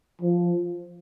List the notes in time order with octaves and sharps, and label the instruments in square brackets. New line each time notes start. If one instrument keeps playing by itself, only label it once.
[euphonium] F3